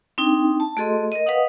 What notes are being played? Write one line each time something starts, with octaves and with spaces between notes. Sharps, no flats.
C4 D4 D#4 G5
A5
A3 F#4 G#4 A4 D#5 C6
A#4 D#5
B4 D#5 F5 F#5 D#6